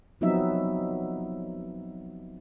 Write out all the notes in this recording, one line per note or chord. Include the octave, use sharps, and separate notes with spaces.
F3 F#3 B3 C4 D#4 E5